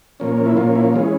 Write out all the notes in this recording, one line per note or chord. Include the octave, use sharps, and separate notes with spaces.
A#2 F3 A#3 C#4
E4
A#2 F3 A#3 C#4 F4
E4
E3 G#3 C#4 F4